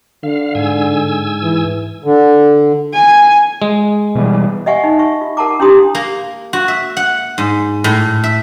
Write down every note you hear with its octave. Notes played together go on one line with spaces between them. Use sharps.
D3 F5
G#2 G#5 E6
E3
D3
G#5
G#3
B2 E3 G3
D#5 E5 F#5 G#5 C#6
D#4
E5 C#6
F4
A#4 F#5 A5 A#5 D6
D4 E4 G4 C6 D#6
A#3
F#4
E5
F#5
G#2
A2
E5